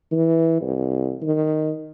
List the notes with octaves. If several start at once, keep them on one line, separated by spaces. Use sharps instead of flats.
E3
C2
D#3